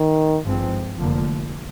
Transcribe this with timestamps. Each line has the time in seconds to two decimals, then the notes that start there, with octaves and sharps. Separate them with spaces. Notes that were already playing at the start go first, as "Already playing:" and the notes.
Already playing: D#3
0.44 G#1 G2 F3 G#3 C4
0.99 F1 F2 D3 F3 A#3